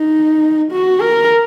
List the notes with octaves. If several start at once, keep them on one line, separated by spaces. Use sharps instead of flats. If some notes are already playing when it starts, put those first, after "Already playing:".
Already playing: D#4
F#4
A#4